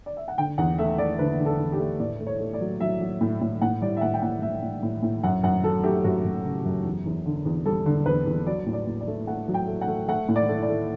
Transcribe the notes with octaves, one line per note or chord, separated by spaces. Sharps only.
D5
E5
F#5
D3 G5
E2 F#5
A3 E5
A3 D5
D3 B4
D3
A4
E2
G4
A3
A2 D5
A3
C#5
A3
D5
F#3
F#3 E5
F#3
A2
A2
A2 F#5
G3 D5
E5
A2 F#5
G5
A2 F#5
A2 E5
A2
A2
A2
F#2 F#5
F#2 F#5
F#3 A4
A3 G4
F#2 F#4
F#2
C#3
F#2
E2
E2
D3
E2
G3 A4
D3
E2 B4
E2
F#3 D5
A2
D5
A2
D5
A3
A3 F#5
F#3
G5
A3
F#5
A3
A3 F#5
A2
D5
A3
D5
A3